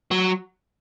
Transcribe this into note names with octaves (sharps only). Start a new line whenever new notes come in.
F#3